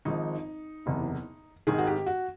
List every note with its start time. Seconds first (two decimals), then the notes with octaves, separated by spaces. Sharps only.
0.05 G#1 G#2 F3 D#4
0.86 F#1 E2 C3
1.67 G#1 G#2 D#3 G#4
1.78 F#4
1.87 G4
2.06 F#4